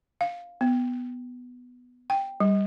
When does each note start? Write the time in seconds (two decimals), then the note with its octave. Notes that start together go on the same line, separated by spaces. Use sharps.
0.21 F5
0.61 B3
2.10 G5
2.40 G3